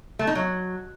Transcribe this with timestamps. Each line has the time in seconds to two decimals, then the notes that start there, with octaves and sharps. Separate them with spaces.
0.19 A3
0.27 D#4
0.35 F#3